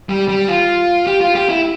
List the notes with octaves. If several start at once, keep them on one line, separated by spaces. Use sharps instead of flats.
G3
G3
F4
G4
F4
G4
E4